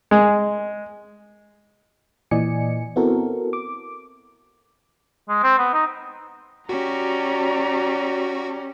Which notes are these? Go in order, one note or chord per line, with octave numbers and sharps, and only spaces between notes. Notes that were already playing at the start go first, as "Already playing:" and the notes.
G#3
A#2 E3 D5 D#5 G#5 C#7
B3 C4 E4 F#4 A4 A#4
D6
G#3
C4
B3
D#4
C#4 F#4 G4 D5 A#5